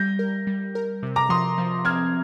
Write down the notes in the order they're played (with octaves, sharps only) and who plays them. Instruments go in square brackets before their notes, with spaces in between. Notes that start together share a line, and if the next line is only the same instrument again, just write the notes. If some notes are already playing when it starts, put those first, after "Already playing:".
Already playing: [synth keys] G3 [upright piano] G6 A#6
[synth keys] A#4
G3
A#4
C3
[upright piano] A#5 D6
[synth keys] F3 [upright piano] C6 D#6
[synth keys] F3
[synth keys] C4 [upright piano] F6 G#6